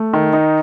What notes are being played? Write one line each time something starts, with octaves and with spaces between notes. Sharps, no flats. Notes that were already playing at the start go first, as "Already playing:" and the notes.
Already playing: A3
D#3
D#4